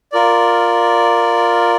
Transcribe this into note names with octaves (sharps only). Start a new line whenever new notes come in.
F4 A#4 D5